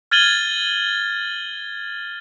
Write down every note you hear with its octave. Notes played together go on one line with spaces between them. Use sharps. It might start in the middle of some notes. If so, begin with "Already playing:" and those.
F6 G#6 A6 D#7 F#7 G7